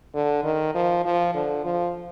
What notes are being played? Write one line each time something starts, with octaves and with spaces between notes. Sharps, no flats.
D3
D#3
F3
F3
D3
F3